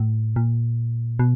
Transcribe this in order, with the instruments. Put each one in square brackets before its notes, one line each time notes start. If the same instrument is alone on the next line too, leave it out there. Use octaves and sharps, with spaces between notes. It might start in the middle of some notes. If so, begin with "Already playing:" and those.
Already playing: [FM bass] A2
A#2
B2